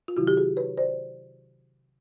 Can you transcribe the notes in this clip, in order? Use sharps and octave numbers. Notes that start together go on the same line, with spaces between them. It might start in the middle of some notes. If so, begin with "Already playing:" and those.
F4
C3 D#3 F#3 E4 F#4
G4
F#4 G#4
B4 C#5
C5 D5